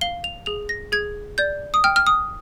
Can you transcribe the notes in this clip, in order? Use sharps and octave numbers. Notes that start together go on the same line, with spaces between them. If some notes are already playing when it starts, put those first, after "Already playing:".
F5 G7
F7
G#4 F7
A#6
G#4 G#6
D5 G6
D#6
G5 F6
F6
D#6